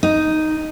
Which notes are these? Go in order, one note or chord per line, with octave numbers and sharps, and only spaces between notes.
D#4